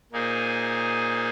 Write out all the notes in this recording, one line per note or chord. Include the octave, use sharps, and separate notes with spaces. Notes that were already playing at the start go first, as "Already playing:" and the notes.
A#2 A#3 D#4 G#4 C5